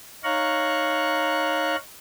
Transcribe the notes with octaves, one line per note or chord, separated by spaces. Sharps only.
D#4 C#5 F5 A#5 C#6 F#6